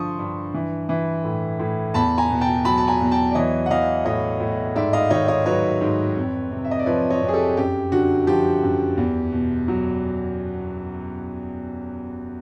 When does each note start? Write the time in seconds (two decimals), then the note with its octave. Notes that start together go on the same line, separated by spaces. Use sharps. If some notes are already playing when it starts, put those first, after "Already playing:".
Already playing: G2 D3 F3 C6 C#6 D#6
0.19 G2
0.54 E3
0.89 E3
1.24 A2
1.59 A2
1.94 E2 A5 B5
2.18 G#5 A#5
2.30 B2
2.41 G5 A5
2.65 F#3 A5 B5
2.77 A5
2.88 G#5 A#5
3.01 E2
3.11 G5 A5
3.31 D5
3.35 E3 C#5 D#5
3.66 F#5
3.70 E3 D#5 F5
4.05 A2 C#5 D#5
4.40 A2
4.76 G#2 D5 E5
4.93 D#5 F5
5.10 D#3 C#5 D#5
5.28 C#5 D#5
5.46 F#3 B4 C#5
5.81 G#2
6.16 F2
6.51 C3
6.64 E5
6.71 D#5
6.79 D5
6.86 F3 B4 C#5
7.10 C#5 D#5
7.22 F2
7.28 G#4
7.34 G4 A4
7.57 F#2 G4
7.92 D3 F#4
8.27 F3 G4
8.63 F#2
8.97 E2
9.32 B2
9.68 F#3